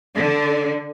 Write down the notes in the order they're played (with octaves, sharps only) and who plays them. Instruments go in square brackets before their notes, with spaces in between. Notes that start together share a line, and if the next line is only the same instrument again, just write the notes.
[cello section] D3